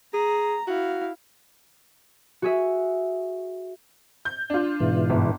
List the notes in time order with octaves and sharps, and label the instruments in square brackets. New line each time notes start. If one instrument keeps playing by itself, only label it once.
[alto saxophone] G#4 [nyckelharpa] A#5
[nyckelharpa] E4 F5 [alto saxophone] F#4
[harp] F#4 G#4 E5
[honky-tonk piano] G6
D4 F4
[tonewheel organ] G#2 B2 E3
[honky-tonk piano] G1